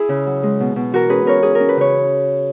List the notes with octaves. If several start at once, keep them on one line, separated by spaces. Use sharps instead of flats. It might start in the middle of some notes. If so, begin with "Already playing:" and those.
Already playing: E4 G#4
C#3
F#3
G#3
B2
B2
E3 F#4 A#4
C#4 G#4 B4
C#4 A#4 C#5
C#4 G#4
A#4
C#4
B4
C#3 C#5